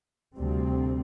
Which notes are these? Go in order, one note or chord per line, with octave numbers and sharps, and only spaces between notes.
D2 C3 G3 C4